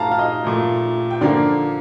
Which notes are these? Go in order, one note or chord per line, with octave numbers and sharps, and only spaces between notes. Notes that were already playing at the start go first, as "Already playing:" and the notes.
Already playing: A#2 A3 F5 A5 A#5
F5
D#5
A#2 A3
G5
D3 F3 A#3 D5 F5